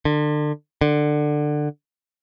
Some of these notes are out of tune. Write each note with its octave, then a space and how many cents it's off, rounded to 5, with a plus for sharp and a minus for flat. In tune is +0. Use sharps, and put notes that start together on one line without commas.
D3 +30
D3 +20